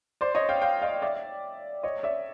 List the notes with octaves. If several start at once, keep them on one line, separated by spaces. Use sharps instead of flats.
C5 D5
C#5 D#5
F5 G5
F5 G5
D#5 F5
D5 E5
C#5 D#5
D5 E5